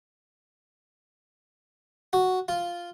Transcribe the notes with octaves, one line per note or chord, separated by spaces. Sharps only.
F#4
F4